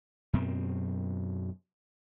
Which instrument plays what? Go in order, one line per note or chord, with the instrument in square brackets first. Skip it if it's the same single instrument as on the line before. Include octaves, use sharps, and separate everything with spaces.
[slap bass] F#2 B2 C4